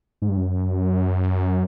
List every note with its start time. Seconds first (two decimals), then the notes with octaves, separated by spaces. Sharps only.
0.22 G#2
0.29 G2
0.37 F#2